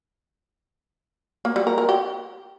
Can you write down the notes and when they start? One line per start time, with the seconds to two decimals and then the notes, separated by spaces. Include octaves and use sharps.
1.45 A#3
1.56 G3
1.67 A#4
1.78 A#4
1.89 G4